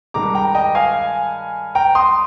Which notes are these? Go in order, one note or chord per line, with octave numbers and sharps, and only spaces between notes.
G2 D#3 G#3 A#5 D6
G5 A#5
D#5 G5
F5 G#5
G5 A#5
C6 D#6